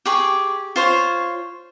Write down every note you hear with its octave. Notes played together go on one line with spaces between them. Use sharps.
G4 G#4 C#6
F4 C5 C#5